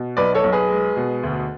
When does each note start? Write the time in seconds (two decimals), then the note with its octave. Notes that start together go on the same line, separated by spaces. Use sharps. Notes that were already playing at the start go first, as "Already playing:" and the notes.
Already playing: B2
0.17 B1 B4 D5
0.35 A4 C#5
0.44 B1
0.52 G#4 B4
0.70 G#3
0.97 B2
1.23 D2